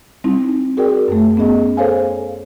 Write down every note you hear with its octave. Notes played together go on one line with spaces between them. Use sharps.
G3 C4 D#4 E4
F#4 G#4 A#4 D5 G5
F#2 A3
B3 C#4 G#4 D#5
G#4 A4 C5 C#5 F5 G#5